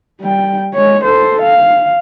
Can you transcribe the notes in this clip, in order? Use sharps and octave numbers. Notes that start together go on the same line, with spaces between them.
G3 G5
G#3 C#5
A4 C5
F5